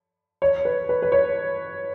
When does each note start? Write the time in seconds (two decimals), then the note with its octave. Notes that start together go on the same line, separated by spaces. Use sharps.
0.42 C#5
0.65 B4
0.89 B4
1.02 B4
1.12 C#5